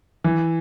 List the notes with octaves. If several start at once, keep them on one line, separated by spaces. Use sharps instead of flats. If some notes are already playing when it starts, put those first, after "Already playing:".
E3